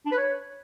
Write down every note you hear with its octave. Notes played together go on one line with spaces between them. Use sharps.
D4
B4
C#5